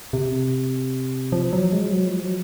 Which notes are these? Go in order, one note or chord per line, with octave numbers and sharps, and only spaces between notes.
C3
F3
F#3
G#3
F#3
F3
F#3